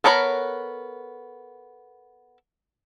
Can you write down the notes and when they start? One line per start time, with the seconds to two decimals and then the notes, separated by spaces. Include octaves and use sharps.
0.04 B3 A4 A#4 C#5 B5